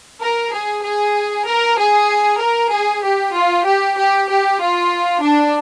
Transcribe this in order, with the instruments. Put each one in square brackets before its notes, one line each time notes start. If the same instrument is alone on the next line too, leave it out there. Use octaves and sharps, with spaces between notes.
[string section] A#4
G#4
G#4
A#4
G#4
A#4
G#4
G4
F4
G4
G4
G4
F4
D4